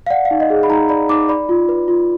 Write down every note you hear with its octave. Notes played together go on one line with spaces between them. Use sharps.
F5
D5 F#5
F5
D#4
D#5
G#4
B5
D#4 A#5
D5 B5
D#4 D6
D5 B5
F4
B4
F4